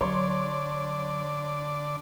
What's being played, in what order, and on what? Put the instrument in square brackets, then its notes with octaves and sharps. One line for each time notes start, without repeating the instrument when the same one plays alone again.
[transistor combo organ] D3 D5 [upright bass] F#3 [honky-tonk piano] C#5 C6